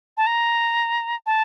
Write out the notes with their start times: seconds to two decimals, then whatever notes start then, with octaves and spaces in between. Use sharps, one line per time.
0.17 A5
0.27 A#5
1.26 A5